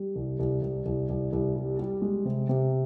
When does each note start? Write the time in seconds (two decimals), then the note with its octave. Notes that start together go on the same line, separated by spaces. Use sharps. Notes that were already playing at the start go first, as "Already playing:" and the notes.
Already playing: G3
0.16 C2
0.39 C2
0.62 C2
0.86 C2
1.09 C2
1.33 C2
1.56 G3
1.79 G3
2.02 G#3
2.25 C3
2.49 C3